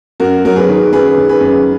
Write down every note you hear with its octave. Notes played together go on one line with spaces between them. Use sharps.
F#2 F#4 A#4
F#3 A#4
G#4 B4
D#3
F#2 G#4 B4
D#3
G#4 B4
F#2